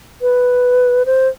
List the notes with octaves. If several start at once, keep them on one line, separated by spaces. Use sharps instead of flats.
B4
C5